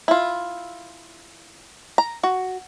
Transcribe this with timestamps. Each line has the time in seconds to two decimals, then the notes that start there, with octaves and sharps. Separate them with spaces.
0.08 E4 F4
1.98 A#5
2.23 F#4